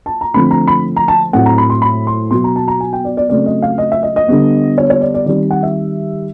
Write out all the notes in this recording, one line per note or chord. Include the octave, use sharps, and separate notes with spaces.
A5
A#5
D3 F3 A3 C4 B5
A#5
B5
A#5
A5
A2 F#3 A3 C4 F#5
A#5
B5
C6
B5
C6
B2 F#3 B3 C6
A#5
A5
A#5
G#5
G5
D5
D5
C#3 F#3 A3 C4 D5
D#5
F5
D#5
E5
D#5
D#5
D3 G3 B3
C#5
C#5
D5
D5
D#3 G3 C4 D5
F#5
E5